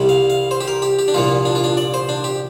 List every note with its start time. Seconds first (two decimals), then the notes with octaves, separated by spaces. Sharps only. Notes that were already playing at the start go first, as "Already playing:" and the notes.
Already playing: C2 C3 G3
0.09 F5
0.30 F5
0.51 C5
0.61 G4
0.68 A#4
0.82 G4
0.99 G4
1.08 D4
1.14 C2 A#2 F3 A#3 F4
1.45 D4
1.55 F4
1.64 D4
1.77 D5
1.94 C5
2.09 D4
2.24 G4